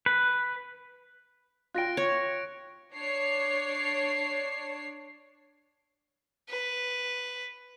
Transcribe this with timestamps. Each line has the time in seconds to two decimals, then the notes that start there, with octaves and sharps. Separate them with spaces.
0.06 B4
1.74 F4 G5 F#6 A#6 D7
1.97 C#5
2.95 D4 C#5 C7
6.49 B4